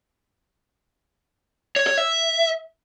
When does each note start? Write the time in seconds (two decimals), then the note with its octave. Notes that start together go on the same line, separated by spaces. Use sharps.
1.76 C#5
1.87 C#5
1.98 E5